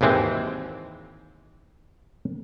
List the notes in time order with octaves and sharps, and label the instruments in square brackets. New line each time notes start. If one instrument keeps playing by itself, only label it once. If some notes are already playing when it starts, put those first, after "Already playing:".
[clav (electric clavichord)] G#1 D#2 E3 G#3 C4